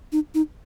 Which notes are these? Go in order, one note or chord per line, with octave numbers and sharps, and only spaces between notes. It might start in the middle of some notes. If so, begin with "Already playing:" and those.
D#4
D#4